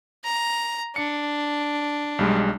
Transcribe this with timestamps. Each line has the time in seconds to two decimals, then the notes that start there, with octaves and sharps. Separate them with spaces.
0.24 A#5
0.96 D4 C#7
2.19 B1 G3 G#3